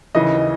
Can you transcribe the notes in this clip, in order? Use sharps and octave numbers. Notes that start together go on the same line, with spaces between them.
D#2 C#3 E3 D#5